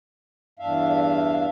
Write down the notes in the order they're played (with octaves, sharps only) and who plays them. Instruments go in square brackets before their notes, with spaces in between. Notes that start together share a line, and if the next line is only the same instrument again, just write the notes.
[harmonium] E2 G2 D4 E5 F5